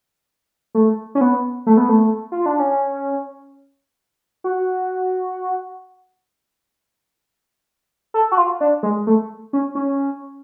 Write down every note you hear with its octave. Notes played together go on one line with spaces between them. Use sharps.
A3
C#4
B3
A3
B3
A3
F4
D4
C#4
F#4
A4
F#4
F4
D4
G#3
A3
C#4
C#4